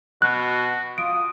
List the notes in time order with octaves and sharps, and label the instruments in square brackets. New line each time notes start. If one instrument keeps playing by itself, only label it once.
[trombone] B2 [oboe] F#4 [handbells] F#6
[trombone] F4 [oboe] D#6 [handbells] D7